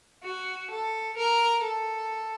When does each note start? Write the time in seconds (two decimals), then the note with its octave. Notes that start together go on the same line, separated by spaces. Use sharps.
0.23 F#4
0.70 A4
1.17 A#4
1.63 A4